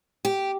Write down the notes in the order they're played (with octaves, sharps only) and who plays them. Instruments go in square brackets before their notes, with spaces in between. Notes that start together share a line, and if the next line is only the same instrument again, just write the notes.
[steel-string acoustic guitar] G4